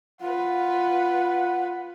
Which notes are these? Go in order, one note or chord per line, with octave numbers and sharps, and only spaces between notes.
F4 B4 F#5